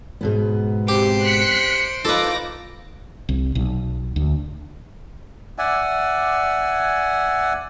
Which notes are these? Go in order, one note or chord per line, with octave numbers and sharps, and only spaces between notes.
G#2 B2 B3
C3 G4 C5 D7
F#6 B6 C#7
D#4 F4 A4 B4 F5 D6 A#6
C2
B1
D2
D5 E5 F#5 G#5